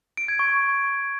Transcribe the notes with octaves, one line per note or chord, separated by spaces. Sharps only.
D7
G#6
C#6